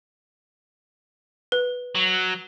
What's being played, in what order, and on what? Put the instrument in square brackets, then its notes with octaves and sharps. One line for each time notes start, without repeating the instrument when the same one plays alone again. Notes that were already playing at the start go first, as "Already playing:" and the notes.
[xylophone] B4
[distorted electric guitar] F#3